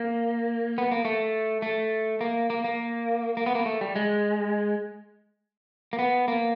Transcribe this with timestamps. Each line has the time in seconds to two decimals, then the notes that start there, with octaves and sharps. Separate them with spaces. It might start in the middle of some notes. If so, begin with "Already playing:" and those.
Already playing: A#3
0.78 B3
0.91 A#3
1.05 A3
1.62 A3
2.21 A#3
2.50 A#3
2.64 A#3
3.37 A#3
3.46 B3
3.55 A#3
3.66 A3
3.81 G3
3.96 G#3
5.93 A#3
5.99 B3
6.28 A#3